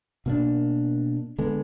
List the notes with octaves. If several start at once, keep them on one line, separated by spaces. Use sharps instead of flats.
B2 A#3 D4
D3 G#3 B3